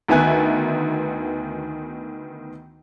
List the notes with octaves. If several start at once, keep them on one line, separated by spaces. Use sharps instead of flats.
D2 D#3 B3 E5 G#5 F#6